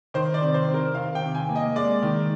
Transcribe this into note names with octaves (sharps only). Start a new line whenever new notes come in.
D#3 C5
D5
C3
C5
C4
A#4
D#3 F5
G5
C3
G#5
A#3
D#5
G#3 D5
D#3